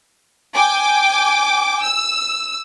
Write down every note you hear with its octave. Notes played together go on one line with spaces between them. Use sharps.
G5 G#5 D6
E6